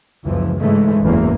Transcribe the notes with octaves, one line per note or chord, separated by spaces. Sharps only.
F#1 C#2 E3 F3
G#2 C#3 E3 G#3 A3
F#1 E2 E3 A#3